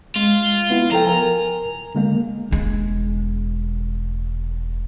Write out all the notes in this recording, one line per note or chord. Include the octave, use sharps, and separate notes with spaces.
G#3 F4
B3 E4
F3 A4 G5 A#5
A#4 G#5
D3 G#3 A#3
E1 G#3